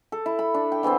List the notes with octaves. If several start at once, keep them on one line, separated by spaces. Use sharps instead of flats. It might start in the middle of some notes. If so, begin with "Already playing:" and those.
A4
E4
B5
D4
G5
D3 E3 B3 C4